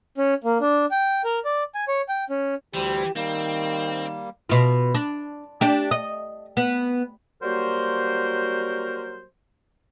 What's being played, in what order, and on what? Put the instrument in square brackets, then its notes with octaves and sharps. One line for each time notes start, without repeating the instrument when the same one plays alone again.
[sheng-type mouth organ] C#4
A#3
D4
G5
A#4
D5
G#5
C#5
G5
C#4
[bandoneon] D2 G3 C5 [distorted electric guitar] E3 [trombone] G4
[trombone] D#3 [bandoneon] G3 A#3 [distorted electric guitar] C4
[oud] B2 F4
D4
D4 G4
D#5
B3
[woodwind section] F#3 G3 A#3 F#4 A#4 C5